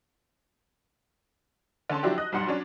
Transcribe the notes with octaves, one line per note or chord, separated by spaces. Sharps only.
D3 C#4 A5 C6
F3 F#3 D4 E4 F#4 G4
D#5 D#6 F#6
B1 G2 G3 F#5 C6
F#3 C#4 D4